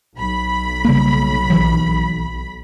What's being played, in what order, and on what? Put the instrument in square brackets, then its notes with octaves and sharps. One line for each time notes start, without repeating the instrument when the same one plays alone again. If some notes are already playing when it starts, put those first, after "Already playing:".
[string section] B1 B5
[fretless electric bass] C#3 G3 A#3
A#1 E3 F#3